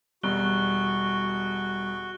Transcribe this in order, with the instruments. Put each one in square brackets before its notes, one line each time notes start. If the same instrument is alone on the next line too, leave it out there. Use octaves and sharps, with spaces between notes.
[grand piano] E1 B2 [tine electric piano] G3 [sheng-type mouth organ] F#4 [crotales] C#6 F#6 G7